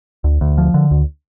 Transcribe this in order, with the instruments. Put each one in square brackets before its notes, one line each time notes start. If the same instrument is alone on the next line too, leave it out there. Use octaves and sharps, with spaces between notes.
[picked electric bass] D2
D2
F3
D3
D2